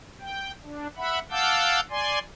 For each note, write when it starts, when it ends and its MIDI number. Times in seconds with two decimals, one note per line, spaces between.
0.21 0.52 79
0.64 0.87 62
0.97 1.19 76
0.97 1.19 78
0.97 1.19 83
1.31 1.80 77
1.31 1.80 78
1.31 1.80 81
1.31 1.80 86
1.31 1.80 88
1.31 1.80 91
1.90 2.19 74
1.90 2.19 80
1.90 2.19 84